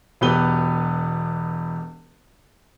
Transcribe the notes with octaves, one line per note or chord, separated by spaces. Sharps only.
E1 B2 B3 G4 B4 G7